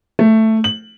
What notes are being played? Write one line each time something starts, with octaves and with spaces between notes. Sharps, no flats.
A3
F#7